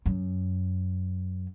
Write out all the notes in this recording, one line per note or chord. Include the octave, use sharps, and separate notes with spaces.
F#2